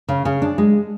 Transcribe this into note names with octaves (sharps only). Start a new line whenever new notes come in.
C#3
C#3
D4
G#3